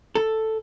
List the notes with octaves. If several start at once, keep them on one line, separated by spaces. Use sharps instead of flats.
A4